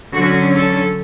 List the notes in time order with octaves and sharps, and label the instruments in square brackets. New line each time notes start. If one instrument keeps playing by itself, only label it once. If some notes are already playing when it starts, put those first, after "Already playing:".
[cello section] D3 F#3 C#4 F#4
A4